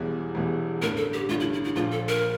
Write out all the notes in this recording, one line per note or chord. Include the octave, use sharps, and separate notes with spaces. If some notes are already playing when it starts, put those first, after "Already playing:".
Already playing: E1 E2 E3 G3
E1 E2 E3 G3
A1 G2 D3 A#4
A4
G4
A1 G2 D3 F4
E4
E4
E4
A#1 A#2 F3 A#3 F4
A4
A#4